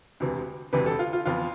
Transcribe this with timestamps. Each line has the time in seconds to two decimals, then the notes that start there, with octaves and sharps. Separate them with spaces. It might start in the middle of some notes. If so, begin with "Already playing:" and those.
0.20 E1 D2 C3 E3
0.73 E1 D2 C3 E3 B4
0.86 A4
0.99 F4
1.13 F4
1.26 F2 E3 B3 F4